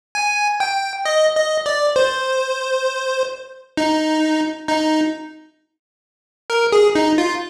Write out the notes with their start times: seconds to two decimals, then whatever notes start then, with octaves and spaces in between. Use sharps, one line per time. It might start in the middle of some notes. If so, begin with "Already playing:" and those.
0.15 G#5
0.60 G5
1.05 D#5
1.36 D#5
1.66 D5
1.96 C5
3.77 D#4
4.68 D#4
6.50 A#4
6.72 G#4
6.95 D#4
7.18 F4